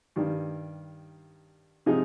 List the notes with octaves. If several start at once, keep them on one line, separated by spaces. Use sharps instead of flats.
G2 D#3 G3
C3 F3 G#3 D#4 G#4